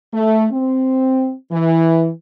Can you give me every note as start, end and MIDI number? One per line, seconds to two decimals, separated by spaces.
0.13 0.46 57
0.51 1.33 60
1.52 2.10 52